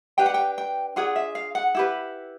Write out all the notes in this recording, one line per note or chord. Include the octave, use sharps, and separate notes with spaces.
D4 G4 B4 G5
F#5
G5
G5
D4 F4 G#4 F#5
E5
F5
F#5
E4 G4 B4